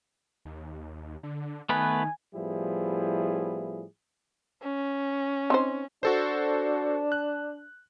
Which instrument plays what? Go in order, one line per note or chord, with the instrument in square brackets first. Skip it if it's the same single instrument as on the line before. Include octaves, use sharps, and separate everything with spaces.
[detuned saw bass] D#2
D3
[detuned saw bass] D#3 [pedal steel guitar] A3 B3 B4 [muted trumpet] G#5
[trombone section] A2 F3 G3 B3 E4 G#4
[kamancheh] C#4
[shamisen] C4 D#4 C5
[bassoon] D4 [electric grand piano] F#4 A4 C5
[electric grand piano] F#6